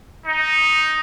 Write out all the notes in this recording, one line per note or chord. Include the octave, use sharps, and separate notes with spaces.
D#4